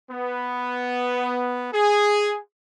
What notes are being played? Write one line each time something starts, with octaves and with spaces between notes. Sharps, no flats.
B3
G#4